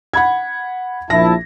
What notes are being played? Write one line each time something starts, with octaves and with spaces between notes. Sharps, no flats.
F#5 B5 G#6
A#1 E4 A5 A#6